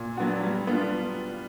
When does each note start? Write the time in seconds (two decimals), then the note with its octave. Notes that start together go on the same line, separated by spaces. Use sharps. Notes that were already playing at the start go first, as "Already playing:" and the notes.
Already playing: A#2
0.17 F#3 B3 D4 F#4
0.42 G3
0.67 B3 D4 F4